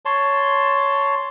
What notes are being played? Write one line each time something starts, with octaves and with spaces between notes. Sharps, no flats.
C#5 A5 C6